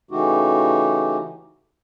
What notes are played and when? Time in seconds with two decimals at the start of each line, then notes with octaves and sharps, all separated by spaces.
0.11 C#3 E3 A3 D#4 F#4 G4